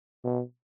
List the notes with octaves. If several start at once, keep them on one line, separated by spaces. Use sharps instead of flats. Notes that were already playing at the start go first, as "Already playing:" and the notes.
B2